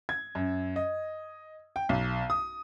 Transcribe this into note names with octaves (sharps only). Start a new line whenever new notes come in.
G#6
F#2
D#5
G5
B1
D#6